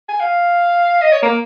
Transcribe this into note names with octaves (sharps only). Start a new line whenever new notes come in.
G#5
F5
D#5
C#5
A#3